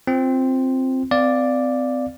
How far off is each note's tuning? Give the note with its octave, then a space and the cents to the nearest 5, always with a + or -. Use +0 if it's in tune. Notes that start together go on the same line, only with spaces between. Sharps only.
C4 +0 F4 +0
C4 -35 D5 +0 F5 +0